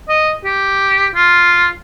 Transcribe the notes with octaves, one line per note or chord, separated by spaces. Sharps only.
D#5
G4
F4